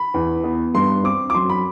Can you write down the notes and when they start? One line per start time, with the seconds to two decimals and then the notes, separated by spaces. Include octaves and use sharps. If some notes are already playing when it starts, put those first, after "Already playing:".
Already playing: B5
0.14 E2
0.44 B3
0.75 G2 C6
1.04 C4 D6
1.30 D6
1.35 F#2 C6
1.49 B5